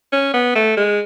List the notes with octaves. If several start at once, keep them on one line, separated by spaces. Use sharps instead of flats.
C#4
B3
A3
G#3